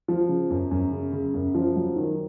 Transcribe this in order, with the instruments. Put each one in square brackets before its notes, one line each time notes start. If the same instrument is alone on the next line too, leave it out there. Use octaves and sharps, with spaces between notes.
[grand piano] F3
C#3
F#2
F#2
C#3
C#3
F#2
F3
F#3
D#3